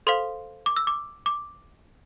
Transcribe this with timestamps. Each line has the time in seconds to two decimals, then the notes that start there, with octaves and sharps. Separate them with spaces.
0.07 A4 C5 F5 C6
0.66 D6
0.77 E6
0.87 D6
1.26 D6